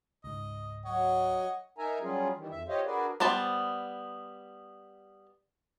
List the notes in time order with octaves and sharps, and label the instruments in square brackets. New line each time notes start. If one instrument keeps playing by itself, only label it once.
[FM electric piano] C#2 G#2 [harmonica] D#5
[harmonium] F#3 [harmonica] C#5 D#5 [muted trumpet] F#5
[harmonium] D#4 A#4 E5 G#5 A#5
F#3 G3 C#4 F4 G#4
D#3 E3 G3
F2 E5
F4 G4 C5 C#5 D#5 F5
D4 F#4 G#4 A#4 B4 D5
[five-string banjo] G3 B3 C5 A5